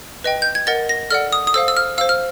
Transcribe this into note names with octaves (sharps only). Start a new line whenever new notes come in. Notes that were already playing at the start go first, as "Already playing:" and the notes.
B4 D#5 G5
G6
G#6
A#4 D#5 F#5 A6
A#6
A4 D5 F#5 F6
D#6
D#6
A4 C5 F5 E6
E6
F6
C5 F5 E6
F6